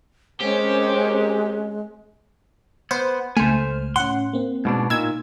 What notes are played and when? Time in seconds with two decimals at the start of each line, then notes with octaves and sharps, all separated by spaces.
0.41 G#3 C4 C#4 G4 A#4 C5
2.91 B3 C5
3.37 C#2 A3 C5 G#5 F6
3.96 A2 C#4 F#5 C6
4.33 A#3 C4
4.65 G#2 B2 D4
4.90 A#2 D#4 E6 G#6